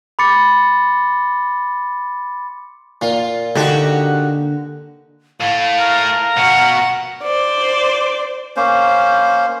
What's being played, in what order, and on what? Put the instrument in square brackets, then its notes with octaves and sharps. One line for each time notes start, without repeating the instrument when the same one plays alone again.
[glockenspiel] B5 C6 D6 A6 C#7
[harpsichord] A#2 [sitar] F4
[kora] D3 [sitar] D#4 F#4 G4
[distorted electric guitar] A2 A3 [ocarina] F5
[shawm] A#4
[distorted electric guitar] B2 F#4 [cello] F#5
[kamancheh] C5 D5
[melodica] A#3 C#4 C5